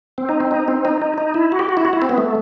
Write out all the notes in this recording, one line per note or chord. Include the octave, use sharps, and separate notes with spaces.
C4
D#4
C4
D#4
C4
D#4
D#4
D#4
E4
F#4
G4
F#4
E4
F#4
E4
C4
B3
A3